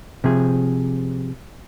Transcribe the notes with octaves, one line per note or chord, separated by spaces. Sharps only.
C3 F3 G#4